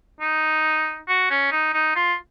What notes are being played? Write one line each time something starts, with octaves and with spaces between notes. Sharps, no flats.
D#4
F#4
C#4
D#4
D#4
F4